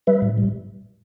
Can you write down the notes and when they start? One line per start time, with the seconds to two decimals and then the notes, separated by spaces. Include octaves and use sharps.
0.07 G3 B4 E5
0.22 A2
0.38 G3